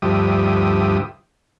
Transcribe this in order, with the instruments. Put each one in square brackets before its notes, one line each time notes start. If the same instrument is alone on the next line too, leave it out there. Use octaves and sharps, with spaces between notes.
[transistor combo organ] D2 G2 F3 G4 E5 D#6